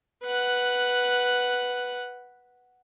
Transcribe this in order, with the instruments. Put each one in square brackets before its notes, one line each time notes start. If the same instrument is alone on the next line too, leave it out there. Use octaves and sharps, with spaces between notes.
[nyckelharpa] B4 F#5